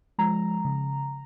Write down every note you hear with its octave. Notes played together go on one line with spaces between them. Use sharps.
F3 G#3 A#5
C#3